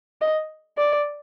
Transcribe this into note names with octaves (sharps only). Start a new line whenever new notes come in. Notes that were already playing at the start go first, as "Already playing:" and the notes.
D#5
D5